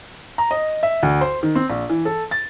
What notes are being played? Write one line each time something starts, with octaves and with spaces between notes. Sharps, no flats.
A#5
D#5
E5
D2
C5
D#3
C4
A#1
E3
A4
A6